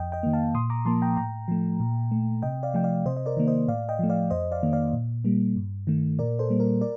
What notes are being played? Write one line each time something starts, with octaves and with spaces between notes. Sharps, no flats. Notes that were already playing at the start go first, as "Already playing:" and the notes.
Already playing: F2 D#5 G5
D#5 G5
D#3 A#3
F5 A5
A#2 C6 D#6
A#5 D6
F3 A#3 A5 C6
G5 A#5
A2 G5 A#5
F3 A3
A#2
A3
C3 D#5 G5
D5 F5
F3 A3 G5
D5 F5
C3 C5 D#5
D#5
A#4 D5
D#3 A#3
C5 D#5
A2 D5 F5
D#5 G5
F3 A3
D5 F5
F2 C5 D#5
D5 F5
D#3 A#3
D5 F5
A#2
G3 A#3
G2
D#3 A3
A#2 A#4 D5
A4 C5
G3 A#3
A#4
A#4 D5